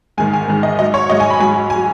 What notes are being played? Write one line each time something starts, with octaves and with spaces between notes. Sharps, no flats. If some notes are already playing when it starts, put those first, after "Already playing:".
G#2 D#3 G#3 G#5
G#5
G#2 D#3 G#3
D#5
G#2 F#3 D#5
C#5
G#2 F#3 D#5
G#5
B5
G#2 F#3 G#5
G#5
F#3